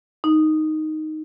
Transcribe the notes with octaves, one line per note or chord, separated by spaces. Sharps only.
D#4